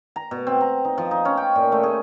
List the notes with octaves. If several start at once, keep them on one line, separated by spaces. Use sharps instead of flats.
A#5
B2
C4
A#5
D#4
F3
D#4
C#4
G5
A#2
A3
G#4